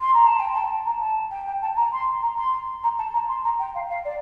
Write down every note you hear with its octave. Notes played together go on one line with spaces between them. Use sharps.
C6
A#5
A5
G5
A5
A#5
A5
G5
G5
A5
A#5
C6
A#5
C6
A#5
A5
A#5
C6
A#5
G5
F5
F5
D5